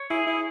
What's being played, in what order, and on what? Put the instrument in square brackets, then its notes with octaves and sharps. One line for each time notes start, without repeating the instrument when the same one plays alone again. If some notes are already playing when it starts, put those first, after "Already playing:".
Already playing: [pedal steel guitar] C#5
[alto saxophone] E4 [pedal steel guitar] G#4
[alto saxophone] E4